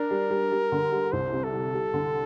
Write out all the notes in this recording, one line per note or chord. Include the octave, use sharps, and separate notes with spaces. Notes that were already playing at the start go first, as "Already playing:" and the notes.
Already playing: D4 A#4
G3
G3
G3
D3
G3
C2 C5
C3
A4
G3
G3
D3